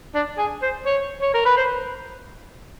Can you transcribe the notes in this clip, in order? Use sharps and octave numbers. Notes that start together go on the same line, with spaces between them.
D4
G#4
C5
C#5
C#5
A#4
B4
C5